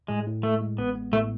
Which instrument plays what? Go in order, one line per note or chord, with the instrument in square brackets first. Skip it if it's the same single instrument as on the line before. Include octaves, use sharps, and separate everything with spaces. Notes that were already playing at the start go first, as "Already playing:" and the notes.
[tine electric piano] A2 [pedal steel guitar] G#3
[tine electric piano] A2
[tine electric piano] A2 [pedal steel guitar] A3
[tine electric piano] G#3
[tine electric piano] A1 [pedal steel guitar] B3
[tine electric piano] B3
[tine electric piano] A2 [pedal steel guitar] A3